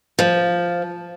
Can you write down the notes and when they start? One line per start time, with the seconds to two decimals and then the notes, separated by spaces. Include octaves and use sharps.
0.19 F3